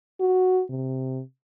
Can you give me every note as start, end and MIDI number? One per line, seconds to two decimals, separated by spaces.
0.20 0.62 66
0.70 1.21 48